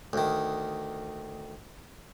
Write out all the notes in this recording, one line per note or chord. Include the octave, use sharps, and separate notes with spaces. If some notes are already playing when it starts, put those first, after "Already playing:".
D2 D#3